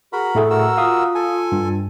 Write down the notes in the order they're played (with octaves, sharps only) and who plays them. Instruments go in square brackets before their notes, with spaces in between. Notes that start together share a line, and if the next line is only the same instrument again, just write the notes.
[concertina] F#4 A#4 B5 [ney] G#4
[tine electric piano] A2 A3 G#4 [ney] A4
[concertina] F#4 A#4 E6
[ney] F4 [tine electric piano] F5 D#6
[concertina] A4 G#5
[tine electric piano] G2